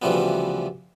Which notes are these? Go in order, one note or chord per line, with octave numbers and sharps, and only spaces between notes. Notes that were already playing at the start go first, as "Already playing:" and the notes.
D2 C#3 E3 F3 G3 B3